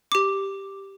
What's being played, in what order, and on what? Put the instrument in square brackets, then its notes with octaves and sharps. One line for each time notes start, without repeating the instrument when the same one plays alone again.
[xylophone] G4 D6